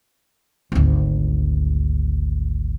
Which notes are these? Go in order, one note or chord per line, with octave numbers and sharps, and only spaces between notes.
G#1 D2